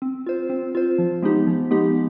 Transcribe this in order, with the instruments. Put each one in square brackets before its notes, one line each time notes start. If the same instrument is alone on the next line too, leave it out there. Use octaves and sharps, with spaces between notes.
[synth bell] C4
F4 C5
C4
F4 C5
F3
G#3 B3 D#4 G4
F3
G#3 B3 D#4 G4